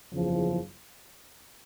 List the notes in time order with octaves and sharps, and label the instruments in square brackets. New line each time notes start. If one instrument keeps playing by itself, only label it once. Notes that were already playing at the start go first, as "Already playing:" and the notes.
[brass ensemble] F#1 E2 C#3 F3